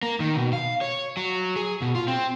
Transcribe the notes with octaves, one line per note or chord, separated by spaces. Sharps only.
A#3
D#3
B2
F5
C#5
F#3
G#4
B2
F4
C4